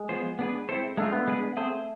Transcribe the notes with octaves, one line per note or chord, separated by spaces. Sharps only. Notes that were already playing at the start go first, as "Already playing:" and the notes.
Already playing: G#3
F3 B3 F4 G#4 C5
B3 D4 G#4 B4
C4 E4 A4 C5
G#3 A3 D4 F4
B3
G#3 D4 G#4 B4
A3 C4 G#4 C5